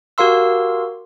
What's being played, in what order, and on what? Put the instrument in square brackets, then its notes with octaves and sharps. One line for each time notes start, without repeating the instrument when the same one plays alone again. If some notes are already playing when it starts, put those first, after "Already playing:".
[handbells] F#4 G4 A#4 F5 C6 E6